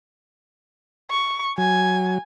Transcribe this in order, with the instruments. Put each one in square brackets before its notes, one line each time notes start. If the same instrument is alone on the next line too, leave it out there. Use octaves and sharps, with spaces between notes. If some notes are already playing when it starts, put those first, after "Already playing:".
[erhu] C#6
[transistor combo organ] F#3 [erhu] G#5